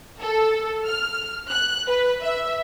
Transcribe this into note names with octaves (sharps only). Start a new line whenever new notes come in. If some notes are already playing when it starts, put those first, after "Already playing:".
A4
F6
F#6
B4
E5